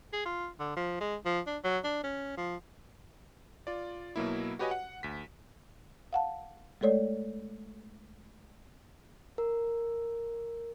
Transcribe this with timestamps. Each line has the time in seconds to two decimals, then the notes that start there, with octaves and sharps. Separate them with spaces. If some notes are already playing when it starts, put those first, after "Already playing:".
0.13 G#4
0.26 F4
0.60 D3
0.76 F3
1.01 G#3
1.26 F3
1.47 D4
1.64 F#3
1.84 D4
2.04 C#4
2.37 F3
3.67 F4 D5
4.16 B2 F#3 A#3 E4
4.59 F#4 G4 B4 C#5 D#5 G#5
4.71 F#5
5.03 D2 B6
6.13 F5 F#5 A5
6.81 G#3 A3 A4 C#5 D5
9.38 A#4